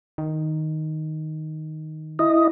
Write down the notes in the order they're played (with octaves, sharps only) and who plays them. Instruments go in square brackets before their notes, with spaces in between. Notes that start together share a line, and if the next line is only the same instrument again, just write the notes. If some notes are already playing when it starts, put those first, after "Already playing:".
[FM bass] D#3
[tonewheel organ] E4 D#5